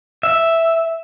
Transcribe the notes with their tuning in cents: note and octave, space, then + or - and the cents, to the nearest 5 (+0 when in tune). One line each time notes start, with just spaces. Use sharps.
E5 +0